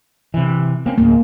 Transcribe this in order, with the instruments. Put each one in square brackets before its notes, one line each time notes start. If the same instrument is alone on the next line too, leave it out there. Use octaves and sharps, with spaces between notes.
[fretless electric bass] C3 E3
A#3 C4 C#4
[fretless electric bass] C#2 G#2 [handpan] A#3